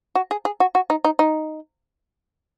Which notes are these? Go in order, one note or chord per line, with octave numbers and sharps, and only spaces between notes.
F#4
G#4
G#4
F#4
F#4
D#4
D#4
D#4